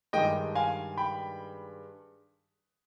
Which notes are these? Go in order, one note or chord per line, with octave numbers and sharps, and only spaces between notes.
G2 D#3 G#3 D#5 G5
F5 G#5
G5 B5